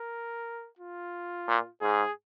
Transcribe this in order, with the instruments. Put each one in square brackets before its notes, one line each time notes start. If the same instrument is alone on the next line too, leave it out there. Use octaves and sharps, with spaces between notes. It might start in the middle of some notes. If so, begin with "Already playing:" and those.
Already playing: [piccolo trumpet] A#4
F4
[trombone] A#2
[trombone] G#2 [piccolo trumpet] G#4